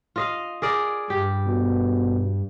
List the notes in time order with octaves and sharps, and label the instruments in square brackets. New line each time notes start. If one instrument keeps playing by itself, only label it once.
[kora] F4 D#5 F5
G#4 A#4 D5
[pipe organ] G2 [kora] G4
[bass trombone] B2